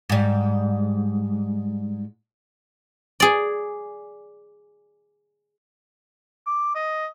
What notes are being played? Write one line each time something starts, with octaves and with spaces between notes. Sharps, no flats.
G#2 G3
G#4 D5
D6
D#5